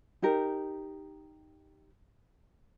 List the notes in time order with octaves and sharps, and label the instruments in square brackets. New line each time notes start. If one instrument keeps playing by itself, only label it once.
[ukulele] D#4 G4 A#4